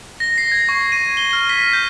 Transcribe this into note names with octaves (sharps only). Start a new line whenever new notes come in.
A#6
C7
G#6
C#6
D#7
G7
F6
B6
G6